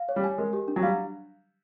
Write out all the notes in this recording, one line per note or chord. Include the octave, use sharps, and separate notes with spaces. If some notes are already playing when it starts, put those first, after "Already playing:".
Already playing: F5
C#5
G3
G#5
G#3 A#4
G4
D4
F#3
G3 F5